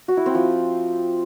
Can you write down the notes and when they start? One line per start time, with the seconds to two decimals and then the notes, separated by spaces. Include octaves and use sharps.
0.08 F#4
0.17 E4
0.26 C4
0.35 F3